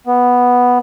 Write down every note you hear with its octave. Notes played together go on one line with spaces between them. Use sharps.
B3